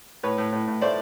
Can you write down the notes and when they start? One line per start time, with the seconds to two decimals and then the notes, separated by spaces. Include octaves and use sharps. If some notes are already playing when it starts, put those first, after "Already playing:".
0.23 A2 B4 C#5
0.38 A2
0.53 A2
0.67 A2
0.81 A3 C5 D5